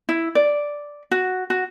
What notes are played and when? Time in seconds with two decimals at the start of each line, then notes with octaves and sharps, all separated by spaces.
0.09 E4
0.35 D5
1.11 F#4
1.50 F#4